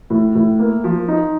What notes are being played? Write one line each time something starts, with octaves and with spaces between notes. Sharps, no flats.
A2
A2
A#3
F3
D#4